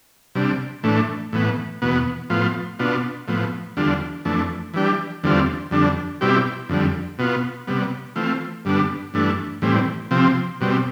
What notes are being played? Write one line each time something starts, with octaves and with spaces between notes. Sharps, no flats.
C3 G3 D4
A2 E3 A3 D4
A2 E3 B3
E2 B2 B3
A2 F3 B3 F4
B2 B3 D4 F4
A2 F3 B3
E2 D3 G3 D4 F4
F2 E3 A3 D4
E3 G3 D4 G4
E2 D3 G3 C4 F4
F2 D3 G3 D4
B2 G3 C4 E4 G4
F2 D3 G3
B2 B3 F4
C3 G3 B3
E3 A3 C4 F4
G2 D3 G3 B3 D4
G2 E3 A3 D4
A2 E3 G3 C4
C3 F3 C4
B2 G3 C4